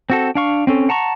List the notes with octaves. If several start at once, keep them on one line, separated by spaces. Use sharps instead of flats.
C4 F#4 A4
D4 F5 C#6
C4 C#4 A4
F#5 A5 A#5 C#6